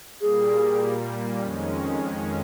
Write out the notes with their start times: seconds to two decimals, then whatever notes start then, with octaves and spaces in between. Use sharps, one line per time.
0.21 A#2 G3 A#3 G#4
1.40 F2 D#3 G#3 C#4